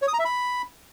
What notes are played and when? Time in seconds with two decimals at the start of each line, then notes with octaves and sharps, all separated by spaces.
0.02 C#5
0.08 D#6
0.14 A#5
0.19 E5
0.25 B5